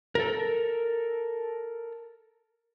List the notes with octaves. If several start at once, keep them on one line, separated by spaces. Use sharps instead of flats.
A4 A#4